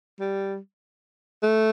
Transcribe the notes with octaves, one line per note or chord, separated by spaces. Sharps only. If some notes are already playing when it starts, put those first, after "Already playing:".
G3
A3